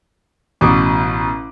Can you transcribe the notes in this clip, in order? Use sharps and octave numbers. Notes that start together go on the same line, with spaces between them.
A1 B2 D6